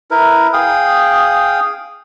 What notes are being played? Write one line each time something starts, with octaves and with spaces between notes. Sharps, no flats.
E4 A#4 B4
G#4 F5 G5 D#6